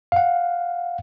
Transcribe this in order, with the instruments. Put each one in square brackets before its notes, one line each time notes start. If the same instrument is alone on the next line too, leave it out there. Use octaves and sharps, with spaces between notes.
[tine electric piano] F5 F#5